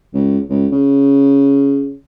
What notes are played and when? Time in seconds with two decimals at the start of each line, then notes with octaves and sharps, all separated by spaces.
0.14 C#2
0.50 C#2
0.72 C#3